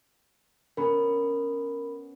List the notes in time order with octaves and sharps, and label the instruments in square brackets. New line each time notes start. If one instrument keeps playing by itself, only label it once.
[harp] B3 C#4 [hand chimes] A#4 B5